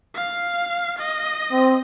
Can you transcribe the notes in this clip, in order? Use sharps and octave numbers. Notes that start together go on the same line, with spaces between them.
F5
D#5
C4